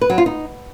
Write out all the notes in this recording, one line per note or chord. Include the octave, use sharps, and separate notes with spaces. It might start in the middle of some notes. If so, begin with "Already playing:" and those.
B4
F#3
F4
D#4